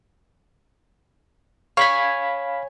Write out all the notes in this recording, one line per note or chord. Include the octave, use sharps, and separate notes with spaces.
C#5 F5 G#5 B5 B6